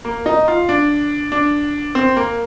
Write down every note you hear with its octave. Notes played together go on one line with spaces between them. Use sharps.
A#3
D#4
F4
D4
D4
C4
A#3